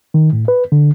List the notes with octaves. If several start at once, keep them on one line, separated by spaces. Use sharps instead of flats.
D#3
A2
B4
D3